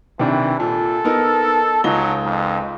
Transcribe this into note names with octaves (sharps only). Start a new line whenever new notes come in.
C3 D#3 E3 D4
A#2 A4
B3 D#4 A#4
C#2 F#3 D#4 G7
F2